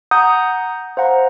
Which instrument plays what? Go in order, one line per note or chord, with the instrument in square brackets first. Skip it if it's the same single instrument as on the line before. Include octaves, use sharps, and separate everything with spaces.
[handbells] F#5 A#5 D#6 G6
C5 F5 F#5 A#5